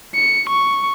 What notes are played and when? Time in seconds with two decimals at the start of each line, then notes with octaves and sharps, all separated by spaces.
0.15 C#7
0.49 C#6